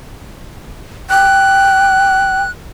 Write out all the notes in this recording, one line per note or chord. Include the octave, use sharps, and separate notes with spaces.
G5 F#6